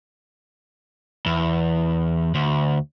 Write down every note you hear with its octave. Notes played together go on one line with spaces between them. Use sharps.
E2
D2